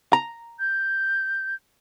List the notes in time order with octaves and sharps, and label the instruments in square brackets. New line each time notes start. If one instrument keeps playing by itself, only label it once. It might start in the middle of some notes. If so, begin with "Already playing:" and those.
[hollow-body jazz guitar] A#5
[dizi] G6